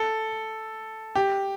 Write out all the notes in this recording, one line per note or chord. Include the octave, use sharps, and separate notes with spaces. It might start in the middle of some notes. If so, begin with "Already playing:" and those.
Already playing: A4
G4